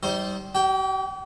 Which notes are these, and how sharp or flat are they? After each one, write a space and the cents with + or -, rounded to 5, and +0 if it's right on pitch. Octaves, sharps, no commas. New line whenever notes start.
G3 -25 D#4 +35 C5 +0
G4 -45 G5 +0